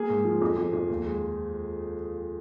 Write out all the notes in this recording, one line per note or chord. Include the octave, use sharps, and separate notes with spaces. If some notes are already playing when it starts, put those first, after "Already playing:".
Already playing: A#3 G#4
G#2
F3
F2
F2
F2
D#2
G#3